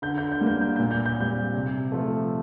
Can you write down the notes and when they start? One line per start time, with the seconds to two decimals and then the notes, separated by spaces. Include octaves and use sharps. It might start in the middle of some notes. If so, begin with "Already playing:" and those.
0.02 D3 G6
0.18 G6
0.32 G6
0.41 G3 A#3
0.47 G6
0.61 G6
0.76 G6
0.79 A#2
0.91 G6
1.06 G6
1.16 G3 C4 G6
1.54 C3
1.92 F3 A3